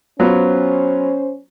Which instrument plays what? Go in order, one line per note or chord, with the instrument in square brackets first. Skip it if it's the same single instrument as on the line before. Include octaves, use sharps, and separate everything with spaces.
[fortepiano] F#3 B3 F4 [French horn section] C#4 C5